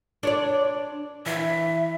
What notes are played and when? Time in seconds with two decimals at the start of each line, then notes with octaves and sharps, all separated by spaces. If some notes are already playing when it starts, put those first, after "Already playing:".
0.23 D4 C#5 D5
1.26 E3 E5